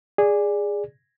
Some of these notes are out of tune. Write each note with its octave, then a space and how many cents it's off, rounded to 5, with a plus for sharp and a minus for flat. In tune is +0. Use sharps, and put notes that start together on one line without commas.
G#4 -15 D5 +0